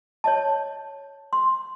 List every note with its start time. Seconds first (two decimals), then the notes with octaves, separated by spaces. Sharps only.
0.24 C#5 D#5 A5
1.33 C6